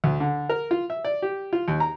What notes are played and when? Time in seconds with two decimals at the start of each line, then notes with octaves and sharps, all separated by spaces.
0.04 D2
0.20 D3
0.49 A#4
0.71 F4
0.90 E5
1.05 D5
1.22 G4
1.53 F4
1.68 D#2
1.80 A#5